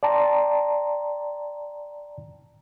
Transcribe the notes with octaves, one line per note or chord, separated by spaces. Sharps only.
D5 G5 A5 A#5 C6